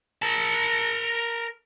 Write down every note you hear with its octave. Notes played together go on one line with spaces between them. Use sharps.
A#4 A5